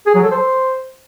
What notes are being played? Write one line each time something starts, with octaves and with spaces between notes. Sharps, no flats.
G#4
F#3
A4
C5